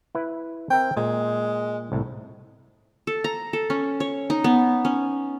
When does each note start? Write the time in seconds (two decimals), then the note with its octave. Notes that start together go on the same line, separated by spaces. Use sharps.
0.15 E4 B4
0.70 C4 A#4 E5 G5
0.97 A#2 G#3
1.92 C2 A2
3.07 A4
3.24 A#5
3.53 A4
3.70 C#4
4.00 C#5
4.30 D#4
4.44 B3
4.85 C#4